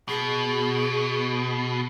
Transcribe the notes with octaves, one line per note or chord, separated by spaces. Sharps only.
B2 G#4